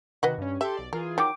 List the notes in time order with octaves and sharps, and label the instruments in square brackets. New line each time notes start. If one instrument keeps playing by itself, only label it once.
[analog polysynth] C3 D#3 F#4 [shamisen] B4 D#5 F#5
[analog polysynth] G2 C#4
[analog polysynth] G4 A4 C6 [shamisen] E5
[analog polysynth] B1 D5
[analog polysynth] E3 F4 G#4 [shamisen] A#4
[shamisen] D#3 F#3 [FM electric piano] G5 D6